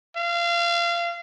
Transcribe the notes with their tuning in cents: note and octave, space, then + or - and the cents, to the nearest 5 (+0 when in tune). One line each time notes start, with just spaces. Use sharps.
F5 -25